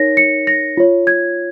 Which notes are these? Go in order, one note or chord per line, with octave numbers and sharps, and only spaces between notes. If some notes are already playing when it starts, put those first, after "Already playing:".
Already playing: D#4 A#4 C#5 A#6
C#7
A#6
F4 C#5
G#6